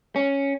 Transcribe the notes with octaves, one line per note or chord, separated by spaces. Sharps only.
C#4